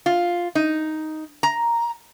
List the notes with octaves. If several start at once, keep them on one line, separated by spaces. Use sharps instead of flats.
F4
D#4
A#5